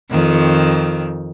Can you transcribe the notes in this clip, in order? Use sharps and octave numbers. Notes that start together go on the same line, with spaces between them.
F2 D#3